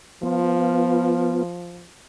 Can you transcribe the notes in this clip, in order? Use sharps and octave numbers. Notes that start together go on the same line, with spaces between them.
F3 B3 F4